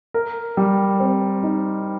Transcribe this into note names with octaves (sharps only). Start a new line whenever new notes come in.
A#4
G3
C4
D#4